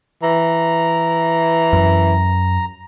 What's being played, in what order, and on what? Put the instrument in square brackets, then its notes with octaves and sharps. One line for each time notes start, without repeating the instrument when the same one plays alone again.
[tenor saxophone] E3 [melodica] A#5
[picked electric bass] F#2